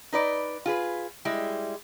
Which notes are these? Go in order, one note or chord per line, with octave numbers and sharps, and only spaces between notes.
D#4 B4 D5
F4 G#4 B4
G3 G#3 E4